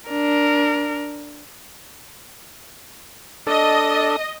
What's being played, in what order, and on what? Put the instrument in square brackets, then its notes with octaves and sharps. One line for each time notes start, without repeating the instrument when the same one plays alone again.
[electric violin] D4 A#4
[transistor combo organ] D4 A4 [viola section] D#5